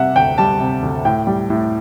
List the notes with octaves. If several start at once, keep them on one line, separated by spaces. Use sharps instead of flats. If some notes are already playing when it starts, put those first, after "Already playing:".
Already playing: C3 G3 E5 F#5
D2 G5
G3 A5
C3
D2
A2 G5
G3
A2